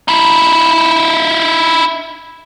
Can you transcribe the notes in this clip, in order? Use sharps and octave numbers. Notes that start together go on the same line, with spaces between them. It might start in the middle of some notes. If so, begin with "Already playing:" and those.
D#4 E4